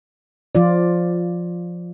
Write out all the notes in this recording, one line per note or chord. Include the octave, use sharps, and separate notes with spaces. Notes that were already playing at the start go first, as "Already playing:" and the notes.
F3 F4 D5